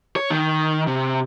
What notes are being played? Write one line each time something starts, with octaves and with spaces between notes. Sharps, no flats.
C#5
D#3
C3